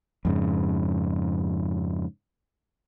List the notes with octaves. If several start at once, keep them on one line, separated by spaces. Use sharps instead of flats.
F2 G#2 C#3